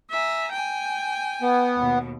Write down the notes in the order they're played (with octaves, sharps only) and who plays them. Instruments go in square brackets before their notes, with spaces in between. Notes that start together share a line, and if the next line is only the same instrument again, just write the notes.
[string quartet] E5 G#5 A#5
G5 G#5
[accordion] B3
[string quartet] D#2 B2